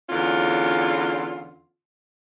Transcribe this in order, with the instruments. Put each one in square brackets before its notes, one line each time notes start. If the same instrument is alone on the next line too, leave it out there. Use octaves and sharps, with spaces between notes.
[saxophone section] E2 D3 C#4 F4